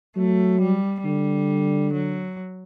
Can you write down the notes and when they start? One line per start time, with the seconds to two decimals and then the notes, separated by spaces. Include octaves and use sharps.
0.16 F#3 A3
0.60 G3
1.04 D3 G3
1.93 F#3